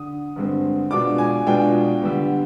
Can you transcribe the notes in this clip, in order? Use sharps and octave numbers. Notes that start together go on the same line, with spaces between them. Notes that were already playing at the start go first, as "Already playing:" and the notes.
Already playing: D3 D#6
G2 D3 G#3 C4
B2 G#3 D4 F4 D6
G#5
B2 G#3 D4 F4 G5
D3 G3 B3